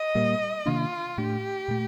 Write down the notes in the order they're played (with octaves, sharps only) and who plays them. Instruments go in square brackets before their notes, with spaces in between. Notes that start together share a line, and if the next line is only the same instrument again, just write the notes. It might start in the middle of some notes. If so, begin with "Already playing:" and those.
Already playing: [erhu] D#5
[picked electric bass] A#2 G3 A#3
[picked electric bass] C3 D#3 A#3 D4 [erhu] F4
[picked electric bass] A2 A3 D4 [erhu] G4
[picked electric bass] A#2 A3